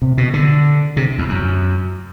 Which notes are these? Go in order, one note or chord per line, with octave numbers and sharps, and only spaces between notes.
C3
B2
D3
C3
E2
F#2